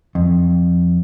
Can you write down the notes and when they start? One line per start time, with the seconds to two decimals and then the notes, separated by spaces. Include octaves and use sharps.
0.15 F2